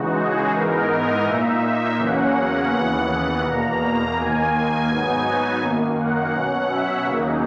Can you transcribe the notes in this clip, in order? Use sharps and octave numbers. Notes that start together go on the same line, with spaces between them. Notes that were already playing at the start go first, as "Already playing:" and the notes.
Already playing: C#3 E3 G#3 D#4 F#4
G#4
G#2 E3 G#3 B3 D#4 A#4
D#5
A#2 A#3 D#4 E5
E2 C#3 F#3 A#3 C#4 F#5
D#2 C#3 E3 B3 F#5
E2 B2 A#3 A#5
D#2 D#3 A#3 G#5
G#2 F#3 B3 D#4 G#5
F#2 D#3 A#3
F#5
B2 F#3 C#4 F#5
E5
D#2 C#3 F#3 A#3 D#4